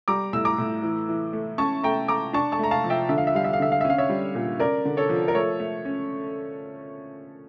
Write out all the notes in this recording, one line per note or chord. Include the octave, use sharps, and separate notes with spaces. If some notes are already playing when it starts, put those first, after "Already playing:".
G3 A#5 D6
A2 E6
A#5 D6
A2
E3
E3
A3
C#4 A5 C#6
A3 G5 A#5
A3 A#5 D6
D4 A5 C#6
A5 C#6
A3 A#5
F5 A5
F3
E5 G5
D3 E5
F5
E5
G3 F5
E5
F5
D3 E5
F5
C#4 E5
F5
C#5 E5
G3
A#2
C#4 A#4 D5
D3
A4 C#5
F3
A#4
A3 A4 C#5
A3
C#4